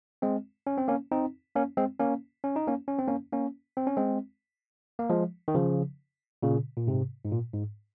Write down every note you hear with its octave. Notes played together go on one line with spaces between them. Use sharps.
G#3 C4
C#4
C4
A#3 C#4
C4 D#4
A#3 C#4
G#3 C4
A#3 C#4
C#4
D#4
A#3 C#4
C#4
C4
A#3 C#4
A#3 C#4
C4
C#4
G#3 C4
A#3
F3 G#3
D#3
C#3 F3
A#2 C#3
A#2
G#2 C3
G#2
A#2
G#2